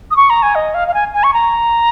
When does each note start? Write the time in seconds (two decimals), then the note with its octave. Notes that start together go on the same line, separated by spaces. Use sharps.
0.11 D#6
0.16 C#6
0.30 A#5
0.42 G#5
0.55 D#5
0.74 F5
0.88 F5
0.94 G#5
1.14 G#5
1.23 C#6
1.34 A#5